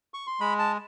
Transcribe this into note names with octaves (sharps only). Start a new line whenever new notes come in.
C#6
C6
G#3 B5
A5